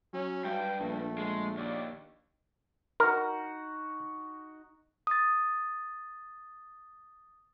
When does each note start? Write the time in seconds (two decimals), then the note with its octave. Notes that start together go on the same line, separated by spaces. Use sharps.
0.14 F#3 C#4
0.45 G2 G5
0.80 A#1 A3
1.18 G#3
1.57 D#2 D5
3.00 D#4 F#4 A#4
5.07 D#6 A6